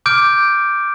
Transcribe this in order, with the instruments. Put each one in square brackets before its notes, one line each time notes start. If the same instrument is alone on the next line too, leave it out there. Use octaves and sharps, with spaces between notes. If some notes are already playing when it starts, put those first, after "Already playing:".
[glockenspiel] D6 F6 G6 D7